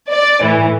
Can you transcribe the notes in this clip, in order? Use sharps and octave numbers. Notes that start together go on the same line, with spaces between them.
D5
A2 E3